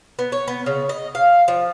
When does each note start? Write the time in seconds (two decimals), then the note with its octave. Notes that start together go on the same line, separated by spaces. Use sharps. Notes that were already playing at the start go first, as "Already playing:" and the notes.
0.19 B3
0.32 C#5
0.48 B3
0.66 C#3
0.89 D#5
1.15 F5
1.48 F3